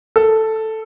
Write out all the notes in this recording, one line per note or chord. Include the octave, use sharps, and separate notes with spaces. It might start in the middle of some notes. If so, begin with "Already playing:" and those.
A4